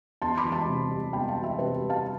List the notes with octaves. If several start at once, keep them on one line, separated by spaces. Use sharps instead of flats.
E2 A5 C6
B5 D6
E3
A5 C6
C3
G3
E2 G5 B5
F5 A5
E3
E5 G5
C3 G4 B4
G3
F5 A5